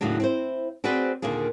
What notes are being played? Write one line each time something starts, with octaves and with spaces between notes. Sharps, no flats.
D#2 A2 C#3 F#3 D4
C4 E4 C5
C4 F#4 G#4 B4 C5 D5
D#2 A#2 D3 A#3 G#4